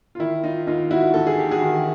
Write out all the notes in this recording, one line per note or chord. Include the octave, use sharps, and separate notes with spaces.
F4
D#3 E4
D#4 F4
D#2 D#4 F4
E4 F#4
D#2 A4
G#4
G4
F#4 G#4
D#3